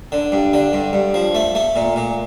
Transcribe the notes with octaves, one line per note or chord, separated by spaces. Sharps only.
D3
G2
D3
G2
G2
F3
A3
A3
A#2
A#2